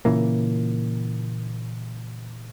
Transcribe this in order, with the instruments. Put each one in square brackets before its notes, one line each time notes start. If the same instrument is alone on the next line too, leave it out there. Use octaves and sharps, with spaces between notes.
[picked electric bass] A#2 C#3 E3 A#3